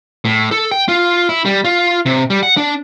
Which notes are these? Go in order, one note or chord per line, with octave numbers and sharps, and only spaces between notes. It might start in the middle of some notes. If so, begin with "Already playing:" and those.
A2
A4
G5
F4
E4
G3
F4
C3
G3
F#5
D4